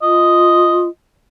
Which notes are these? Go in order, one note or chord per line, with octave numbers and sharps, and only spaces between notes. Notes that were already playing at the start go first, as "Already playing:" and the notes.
F4 D#5